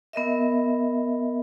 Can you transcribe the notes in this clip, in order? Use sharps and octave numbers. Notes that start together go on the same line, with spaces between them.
B3 A#4 D#5 E5